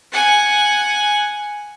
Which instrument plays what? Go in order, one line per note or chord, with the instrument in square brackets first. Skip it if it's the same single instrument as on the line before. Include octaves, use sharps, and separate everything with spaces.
[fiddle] F#5 G#5